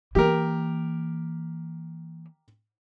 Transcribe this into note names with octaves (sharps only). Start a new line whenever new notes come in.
E3 A#3 G4 A#4